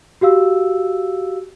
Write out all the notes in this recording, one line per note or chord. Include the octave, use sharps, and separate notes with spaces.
F#4 G4 F5 E6